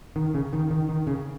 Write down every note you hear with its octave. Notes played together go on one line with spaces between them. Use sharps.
D#3
C#3
D#3
D#3
D#3
C#3